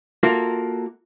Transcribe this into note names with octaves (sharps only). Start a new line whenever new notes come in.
A#3 F4 F#4 A4 A#4 E5